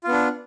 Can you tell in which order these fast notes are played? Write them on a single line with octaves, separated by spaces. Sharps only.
F4 B3 D4